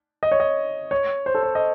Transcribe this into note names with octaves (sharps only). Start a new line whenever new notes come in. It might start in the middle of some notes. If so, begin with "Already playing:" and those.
D#5
C#5
D#5
C#5
C5
A4
C5
D#5